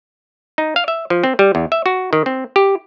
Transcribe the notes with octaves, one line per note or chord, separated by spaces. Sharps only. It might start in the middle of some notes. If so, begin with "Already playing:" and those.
D#4
F5
E5
F3
C4
G3
E2
E5
F#4
D#3
C4
G4